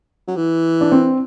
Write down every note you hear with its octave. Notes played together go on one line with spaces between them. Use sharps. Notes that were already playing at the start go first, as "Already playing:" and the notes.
F#3
E3
D4
C4